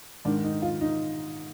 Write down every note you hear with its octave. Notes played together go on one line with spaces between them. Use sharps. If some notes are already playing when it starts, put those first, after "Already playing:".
G#2 D#3 D4
D#4
F4
D#4